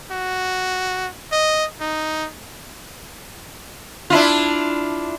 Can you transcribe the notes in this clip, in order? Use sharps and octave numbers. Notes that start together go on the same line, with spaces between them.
F#4
D#5
D#4
D4 E4 F4